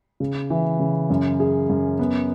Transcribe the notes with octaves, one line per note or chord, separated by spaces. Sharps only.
C#3
E3
C#3
F#2
G#4
F#2
B3